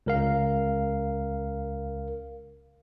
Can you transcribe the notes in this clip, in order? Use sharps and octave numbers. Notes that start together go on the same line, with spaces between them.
C#2 A#4 F5